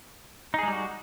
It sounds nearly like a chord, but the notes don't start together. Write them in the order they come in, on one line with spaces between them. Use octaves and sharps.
D#4 G#4 G#3 G3 F#4